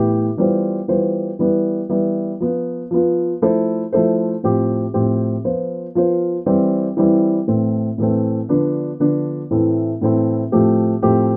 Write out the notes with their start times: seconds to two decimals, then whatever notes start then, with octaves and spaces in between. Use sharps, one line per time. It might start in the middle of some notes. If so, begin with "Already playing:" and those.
Already playing: A2 E3 B3 E4 G4
0.37 E3 G3 B3 F4 C5
0.88 E3 G3 B3 F4 C5
1.39 E3 G3 B3 E4
1.89 E3 G3 B3 E4
2.40 F3 B3 F4
2.91 F3 B3 F4
3.42 F3 A3 E4 A4 C5
3.92 F3 A3 E4 A4 C5
4.43 A2 F3 C4 G4
4.94 A2 F3 C4 G4
5.44 F3 B3 F4 C5
5.95 F3 B3 F4 C5
6.46 E3 G3 C4 E4
6.97 E3 G3 C4 E4
7.47 A2 E3 A3 C4
7.98 A2 E3 A3 C4
8.49 D3 F3 B3 D4
9.00 D3 F3 B3 D4
9.51 A2 E3 A3 C4 E4
10.01 A2 E3 A3 C4 E4
10.52 A2 F3 A3 C4 G4
11.02 A2 F3 A3 C4 G4